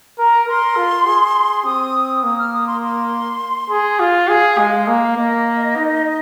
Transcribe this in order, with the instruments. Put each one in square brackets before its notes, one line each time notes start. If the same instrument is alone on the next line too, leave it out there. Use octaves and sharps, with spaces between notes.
[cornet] A#4 [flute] A#5
[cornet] A#4 [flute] C6
[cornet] F4
G#4
[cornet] C4 [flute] D#6
[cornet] A#3 [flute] D#6
[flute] F6
D#6
C6
C6
[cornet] G#4
[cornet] F4 [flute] F5
[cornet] G#4
G#3
A#3
[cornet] A#3 [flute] D#5
[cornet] D#4